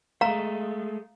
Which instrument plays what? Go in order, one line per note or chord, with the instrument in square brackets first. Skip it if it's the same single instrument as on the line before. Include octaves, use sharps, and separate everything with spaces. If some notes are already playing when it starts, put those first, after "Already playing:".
[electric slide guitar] G#3 A3 [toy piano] F5 A#5